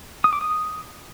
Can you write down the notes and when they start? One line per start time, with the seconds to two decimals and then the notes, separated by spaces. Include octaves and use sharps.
0.24 D#6
0.33 D6
0.41 D#6